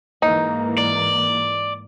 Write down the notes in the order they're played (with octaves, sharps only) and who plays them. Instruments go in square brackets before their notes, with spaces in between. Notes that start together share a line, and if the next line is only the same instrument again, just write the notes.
[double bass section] G#2 E3 A#3 [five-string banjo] D#4
[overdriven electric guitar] D5